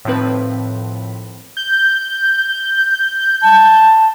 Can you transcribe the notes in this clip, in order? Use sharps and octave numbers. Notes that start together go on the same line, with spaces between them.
A2 D#3 F3 C4 B4
G6
A5